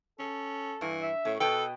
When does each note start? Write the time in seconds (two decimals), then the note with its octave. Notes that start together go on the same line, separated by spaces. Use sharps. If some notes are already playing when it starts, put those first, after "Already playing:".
0.19 C#4 A4
0.81 G2 E3
1.02 E5
1.25 A2 C#4
1.40 B2 A4 B4 D#5 G5